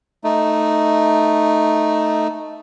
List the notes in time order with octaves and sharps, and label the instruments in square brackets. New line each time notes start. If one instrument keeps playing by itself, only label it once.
[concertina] A3 D#4